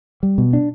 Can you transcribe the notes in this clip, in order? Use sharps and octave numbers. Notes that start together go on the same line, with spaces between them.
G3
B2
D4